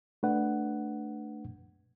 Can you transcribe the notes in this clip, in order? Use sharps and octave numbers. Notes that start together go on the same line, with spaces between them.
A3 D4 B4 F#5